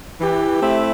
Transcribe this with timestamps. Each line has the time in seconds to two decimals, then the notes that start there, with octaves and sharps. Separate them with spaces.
0.21 E3 G4
0.61 A3 C4 E4